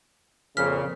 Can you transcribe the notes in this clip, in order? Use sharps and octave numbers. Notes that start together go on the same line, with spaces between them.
F2 A#2 C#3 F6 B6